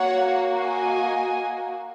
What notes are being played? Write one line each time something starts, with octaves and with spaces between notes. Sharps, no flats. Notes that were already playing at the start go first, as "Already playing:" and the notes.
Already playing: A#3 F#4 C#5 F#5
D#5 G#5